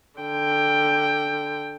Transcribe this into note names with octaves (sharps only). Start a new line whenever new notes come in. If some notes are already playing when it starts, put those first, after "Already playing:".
D3 G5